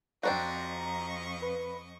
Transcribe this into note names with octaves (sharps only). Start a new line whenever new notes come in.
F2 C4 D4 F#4 D#5 A#5 C#6
B4